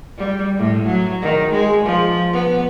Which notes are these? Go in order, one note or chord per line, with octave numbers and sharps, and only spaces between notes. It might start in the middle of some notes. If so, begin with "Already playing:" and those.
G3
A2
F#3
D#3
G#3
F3
B3